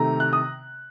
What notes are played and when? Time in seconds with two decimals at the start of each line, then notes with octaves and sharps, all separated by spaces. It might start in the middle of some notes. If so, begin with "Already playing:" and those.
Already playing: C3 D#3 A3 A#5
0.20 F#6
0.33 D#6